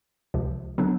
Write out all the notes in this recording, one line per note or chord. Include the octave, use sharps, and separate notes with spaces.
C#2 C3 F3
D3 F#3 B3 D4